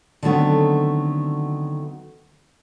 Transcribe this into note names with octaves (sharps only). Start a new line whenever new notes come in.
D3 D#3 F#3 A3 B3 C4